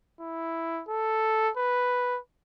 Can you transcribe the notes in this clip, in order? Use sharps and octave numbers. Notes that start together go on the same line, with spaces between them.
E4
A4
B4